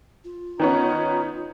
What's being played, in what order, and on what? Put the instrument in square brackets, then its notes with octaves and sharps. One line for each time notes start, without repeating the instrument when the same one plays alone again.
[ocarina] F4
[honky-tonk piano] D#3 B3 C#4 [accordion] D#4